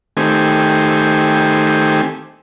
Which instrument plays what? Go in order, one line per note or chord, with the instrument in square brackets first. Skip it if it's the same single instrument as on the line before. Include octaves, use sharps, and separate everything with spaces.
[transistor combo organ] D#3 A3 C4 G4 G#5